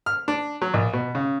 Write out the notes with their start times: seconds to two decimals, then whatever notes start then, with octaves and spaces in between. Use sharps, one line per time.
0.06 F6
0.28 D4
0.62 F#3
0.74 A#1
0.93 B2
1.15 C#3